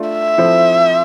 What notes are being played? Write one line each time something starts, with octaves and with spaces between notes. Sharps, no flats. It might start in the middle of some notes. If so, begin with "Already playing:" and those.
Already playing: A3 D4 F4
E5
F3 C4 E4 A4 C5